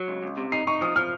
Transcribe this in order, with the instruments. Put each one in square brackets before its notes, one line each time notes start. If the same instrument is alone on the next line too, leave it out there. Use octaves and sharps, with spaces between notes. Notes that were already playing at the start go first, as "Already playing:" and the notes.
Already playing: [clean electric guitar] F#3
C#2
C#2
C3
[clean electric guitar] D#4 [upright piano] C7
[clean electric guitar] D#4 [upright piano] C#6
[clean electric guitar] F3 [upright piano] D#6
[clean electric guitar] F3 [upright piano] F6